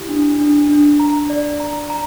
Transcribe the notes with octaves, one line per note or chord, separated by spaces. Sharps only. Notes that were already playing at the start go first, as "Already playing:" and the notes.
Already playing: E4 G4
D4
D4
D4
A#5
D5
A#5
A#5